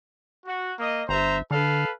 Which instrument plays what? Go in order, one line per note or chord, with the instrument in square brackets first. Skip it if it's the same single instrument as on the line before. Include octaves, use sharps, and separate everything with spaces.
[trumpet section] F#4
A#3 D#5
[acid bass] G1 [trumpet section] C5 E5 A#5
[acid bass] D3 [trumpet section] A4 B4 F5